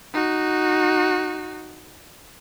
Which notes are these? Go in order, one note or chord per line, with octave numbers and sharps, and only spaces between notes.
D#4 F#4